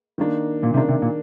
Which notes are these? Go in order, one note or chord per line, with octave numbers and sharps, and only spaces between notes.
D#3 A#3 D4
A#2
C3 D#3 A#3 D4
C3
A#2